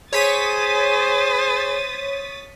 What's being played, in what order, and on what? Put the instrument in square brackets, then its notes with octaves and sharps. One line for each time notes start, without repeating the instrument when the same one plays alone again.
[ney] G#4 [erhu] C5 [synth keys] C#5 B6 D#7 [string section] D#6 A6